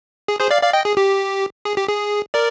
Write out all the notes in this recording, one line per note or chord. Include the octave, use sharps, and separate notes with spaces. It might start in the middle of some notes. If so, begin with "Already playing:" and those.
G#4
G#4 C5
D5 F5
D5 F5
D#5 G5
G#4
G4
G#4
G4
G#4
A#4 D5